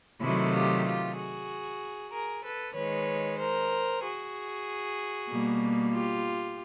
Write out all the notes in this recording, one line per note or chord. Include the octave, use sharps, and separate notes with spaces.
C3 D#3 F#3 A3 E4 F#4
F4 G4
F4 G4
F#4 G#4
G#4 A#4
A4 B4
D#3 G#3 B4 C#5
A#4 C5
F#4 G#4
B2 G3 A#3
F4 G4